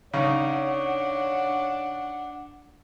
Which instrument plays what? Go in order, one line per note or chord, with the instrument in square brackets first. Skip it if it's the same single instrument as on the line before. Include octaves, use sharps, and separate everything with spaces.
[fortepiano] C#3 D#4 [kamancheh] D4 F#5 [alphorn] C#5